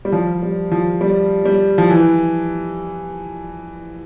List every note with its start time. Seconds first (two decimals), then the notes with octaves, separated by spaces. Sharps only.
0.05 G3
0.12 F3
0.43 G3
0.72 F3
1.01 G3
1.45 G3
1.78 F3
1.90 E3